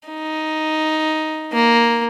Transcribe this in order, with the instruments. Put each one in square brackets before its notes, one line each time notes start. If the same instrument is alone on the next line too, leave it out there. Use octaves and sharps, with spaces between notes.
[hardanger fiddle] D#4
A#3